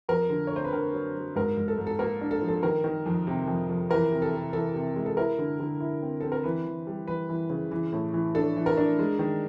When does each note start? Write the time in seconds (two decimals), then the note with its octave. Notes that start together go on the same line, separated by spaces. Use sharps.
0.09 F2 A#4
0.30 D3
0.47 C#5
0.51 A3
0.56 C5
0.65 B4
0.73 D3 A#4
0.94 F#3
1.15 F#3
1.36 G#2 A#4
1.57 G#2
1.68 A4
1.78 G#2
1.87 A4
1.99 A#3 A#4
2.21 D4
2.31 A4
2.41 F3
2.48 A4
2.63 D#3 A#4
2.84 D#3
3.06 F2
3.27 C3
3.47 F2
3.69 F2
3.90 E3 A#4
4.12 C3
4.22 A4
4.33 C3
4.53 E3 A4
4.74 C3
4.96 G#3
5.06 A4
5.17 E4 A#4
5.38 D3
5.60 D3
5.80 E4
6.02 C4
6.21 C4 A4
6.32 A#4
6.44 E3 B4
6.66 E3
6.87 G3
7.07 E3 B4
7.29 E3
7.50 C#3
7.71 E3
7.93 A2
8.14 E3
8.35 D4 A4
8.56 E3
8.66 A#4
8.77 D4
8.99 G#3
9.19 D#3